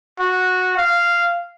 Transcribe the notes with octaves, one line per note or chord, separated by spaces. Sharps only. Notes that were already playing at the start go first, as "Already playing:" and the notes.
F#4
F5